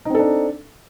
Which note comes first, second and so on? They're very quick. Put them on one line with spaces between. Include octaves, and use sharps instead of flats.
D#4 C4 A4 D4